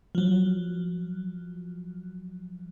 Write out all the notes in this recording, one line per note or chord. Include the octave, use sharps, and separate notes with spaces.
F3 F#3